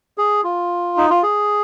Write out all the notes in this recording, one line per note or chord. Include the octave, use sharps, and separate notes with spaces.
G#4
F4
D#4
F4
G#4